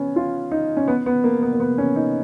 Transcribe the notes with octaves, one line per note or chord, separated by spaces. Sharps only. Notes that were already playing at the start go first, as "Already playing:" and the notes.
Already playing: B3 C#4
F4
D#4
C#4
B3
B3
A#3
B3
A#3
B3
C#4
D#4